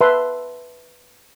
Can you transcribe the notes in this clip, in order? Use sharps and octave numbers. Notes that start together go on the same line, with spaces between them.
B4 E5 A5 C6